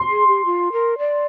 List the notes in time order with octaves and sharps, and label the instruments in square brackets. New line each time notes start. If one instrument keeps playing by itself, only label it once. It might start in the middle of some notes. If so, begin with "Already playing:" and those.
Already playing: [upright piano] C6
[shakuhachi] G#4
G4
F4
A#4
D5